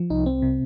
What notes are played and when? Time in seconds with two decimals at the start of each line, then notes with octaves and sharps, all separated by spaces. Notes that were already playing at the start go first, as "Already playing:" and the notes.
Already playing: F3
0.10 C2 D#4
0.26 C4
0.42 C3